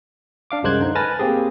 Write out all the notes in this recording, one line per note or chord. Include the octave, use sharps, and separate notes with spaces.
D4 F5 D6
C2 F#2 G#3 C5 F#6 G#6
D3 D#4
B4 G#5 A5 F6 A6 A#6
A#3 C4 G4 G#4